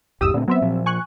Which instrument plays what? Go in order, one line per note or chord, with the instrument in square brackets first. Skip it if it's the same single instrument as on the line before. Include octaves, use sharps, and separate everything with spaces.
[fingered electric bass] A1 E2 G#2 [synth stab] G4 D#6 E6
[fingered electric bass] A#2 A3 C4 [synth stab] D3
[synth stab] F#3 C4 E5 [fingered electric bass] B3
[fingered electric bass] A#2 F3
[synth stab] G#5 C#6 F#6